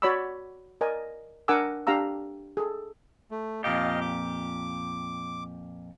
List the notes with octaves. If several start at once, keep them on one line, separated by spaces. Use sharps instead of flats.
F#4 C#5 D5 B5 D6 E6
A#4 D5 D#5 G#5
D4 A#4 F#5 G#5 D6 E6
D4 G4 F5 A#5 E6
G#4 A4
A3
F2 A#2 G4 D#5 F5
D6